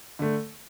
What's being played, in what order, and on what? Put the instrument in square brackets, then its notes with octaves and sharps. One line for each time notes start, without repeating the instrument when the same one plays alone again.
[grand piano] D3 A3